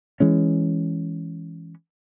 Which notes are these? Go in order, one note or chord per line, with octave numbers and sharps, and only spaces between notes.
E3 G#3 C#4